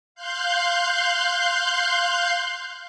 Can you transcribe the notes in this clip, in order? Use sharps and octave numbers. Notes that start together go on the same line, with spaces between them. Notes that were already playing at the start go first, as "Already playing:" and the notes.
F5 C6 F#6 G6